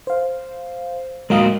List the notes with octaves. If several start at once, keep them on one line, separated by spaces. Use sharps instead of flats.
C5 F5
G#3 A#3 F#4 A#4 F5 D#6